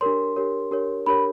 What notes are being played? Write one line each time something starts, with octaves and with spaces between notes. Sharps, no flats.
D4 G4 A#4 C#5 C6
D4 G4 A#4 C#5
D4 G4 A#4 C#5
D4 G4 A#4 C#5 B5